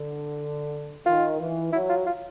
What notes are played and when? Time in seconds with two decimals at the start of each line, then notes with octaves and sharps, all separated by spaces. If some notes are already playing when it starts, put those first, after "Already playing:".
Already playing: D3
1.06 D#3 F4
1.39 E3
1.73 F#3 E4
1.90 F4
2.06 F4